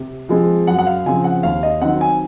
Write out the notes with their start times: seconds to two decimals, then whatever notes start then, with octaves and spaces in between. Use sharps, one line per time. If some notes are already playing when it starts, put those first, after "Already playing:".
Already playing: C3
0.29 F3 G#3 C4
0.67 F#2 F#5
0.79 F#5
0.87 F5
1.06 C#3 F3 C4 G#5
1.24 F#5
1.43 D#2 F5
1.63 D#5
1.82 D#3 F#3 C4 F#5
2.01 G#5